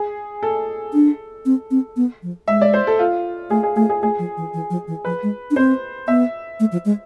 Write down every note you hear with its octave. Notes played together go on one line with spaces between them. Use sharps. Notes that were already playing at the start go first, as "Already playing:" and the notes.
Already playing: G#4
A4
D4
C4
C4
B3
F3
G#3 E5
D5
C5
A4
F4
A3 G#4
G#4
A3 G#4
G#4
A3 G#4
F3
E3
E3
F3
E3
F3 B4
G#3
D4
C4 C5
B3 E5
A3
F3
G#3